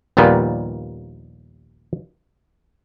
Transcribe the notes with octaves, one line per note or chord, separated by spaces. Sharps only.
A#1 D#2 A#2 G3 B3